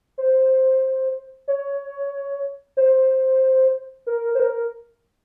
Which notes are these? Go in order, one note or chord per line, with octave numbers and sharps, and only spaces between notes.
C5
C#5
C5
A#4
C5
A#4